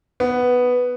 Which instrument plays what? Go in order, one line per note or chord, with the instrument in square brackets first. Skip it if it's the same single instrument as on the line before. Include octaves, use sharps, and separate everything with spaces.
[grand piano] B3